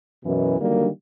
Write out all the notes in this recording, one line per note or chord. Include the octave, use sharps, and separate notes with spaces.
F#2 B2 E3
D3 D#3 F#3 G3 A#3 D4